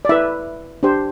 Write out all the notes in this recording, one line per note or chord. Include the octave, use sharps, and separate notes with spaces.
D5
E4 B4 E5
D4 G4 C5